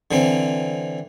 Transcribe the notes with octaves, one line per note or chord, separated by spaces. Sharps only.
D3 E3 C4